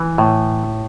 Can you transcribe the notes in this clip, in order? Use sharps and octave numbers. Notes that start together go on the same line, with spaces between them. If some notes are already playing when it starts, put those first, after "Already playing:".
Already playing: E3
A2